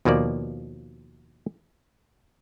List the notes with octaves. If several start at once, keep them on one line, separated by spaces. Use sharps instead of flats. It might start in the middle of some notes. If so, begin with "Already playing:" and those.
D#2 B2 F3 A#3 D5